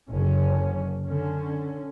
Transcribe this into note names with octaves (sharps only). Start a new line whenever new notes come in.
F#1 D3 C#4
D3 C#4